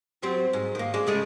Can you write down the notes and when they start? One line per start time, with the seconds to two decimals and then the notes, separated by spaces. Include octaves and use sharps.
0.22 F#3 G3 C4
0.53 G#2
0.75 D#3 A#3
0.94 G#3 D4
1.07 C#3 G#3 A3